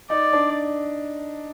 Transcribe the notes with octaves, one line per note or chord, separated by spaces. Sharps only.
D#4 D5
D4